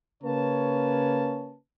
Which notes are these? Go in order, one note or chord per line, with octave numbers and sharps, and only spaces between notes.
C#3 A#3 C#4 B4 C#5 A5